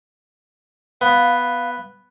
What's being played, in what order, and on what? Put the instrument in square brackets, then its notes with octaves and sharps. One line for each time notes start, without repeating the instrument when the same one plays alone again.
[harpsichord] B3 [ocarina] F5